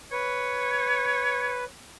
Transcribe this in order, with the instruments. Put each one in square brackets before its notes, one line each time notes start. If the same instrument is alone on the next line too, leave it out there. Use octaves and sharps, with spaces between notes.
[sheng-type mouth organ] B4 [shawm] C#5